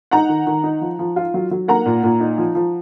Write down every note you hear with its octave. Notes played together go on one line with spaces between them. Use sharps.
D#4 F#5 A#5
D#3
D#3
D#4
F3
F3
F4
F#3
F#3
A#3 F#5 A#5
A#2
A#2
D#4
F3
F3